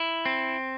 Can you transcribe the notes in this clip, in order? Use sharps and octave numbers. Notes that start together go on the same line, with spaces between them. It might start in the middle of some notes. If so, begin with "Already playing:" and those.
Already playing: E4
C4